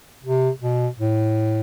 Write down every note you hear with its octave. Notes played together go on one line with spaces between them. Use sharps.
C3
B2
A2